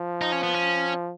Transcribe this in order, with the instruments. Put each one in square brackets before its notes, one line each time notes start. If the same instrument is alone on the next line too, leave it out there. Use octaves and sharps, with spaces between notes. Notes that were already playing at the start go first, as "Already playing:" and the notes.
Already playing: [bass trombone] F3
[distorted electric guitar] D#4
C#4
B3
C#4